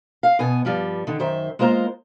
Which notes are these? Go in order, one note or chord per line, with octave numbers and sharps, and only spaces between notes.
F5
B2 B3 G#5
G2 F3 G3
D3 D#3
F#2 D#3 C5 E5
G#3 A#3 F4 C5 A#5